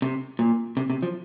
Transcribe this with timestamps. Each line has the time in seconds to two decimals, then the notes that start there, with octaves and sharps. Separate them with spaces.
0.02 C3
0.39 A#2
0.77 C3
0.90 C3
1.02 F3